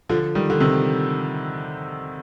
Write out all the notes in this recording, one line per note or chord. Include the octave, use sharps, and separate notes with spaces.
D3 F3
D#3 G3
D3
C3 D#3